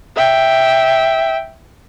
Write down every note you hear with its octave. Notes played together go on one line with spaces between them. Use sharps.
E5 G5